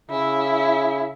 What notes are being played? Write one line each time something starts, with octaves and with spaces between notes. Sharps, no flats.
C#3 E4